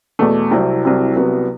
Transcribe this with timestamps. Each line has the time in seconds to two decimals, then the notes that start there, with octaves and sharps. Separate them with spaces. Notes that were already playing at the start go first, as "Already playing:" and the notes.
0.19 E2 B2 A3
0.51 C2 C3 F#3 C4 E4
0.83 C2 C3 F#3 C4 E4
1.16 C2 C3 F#3 B3